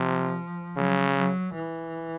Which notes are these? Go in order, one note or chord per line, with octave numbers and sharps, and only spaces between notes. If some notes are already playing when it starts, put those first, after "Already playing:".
Already playing: C3 F3
C#3 F#3
F#3
E3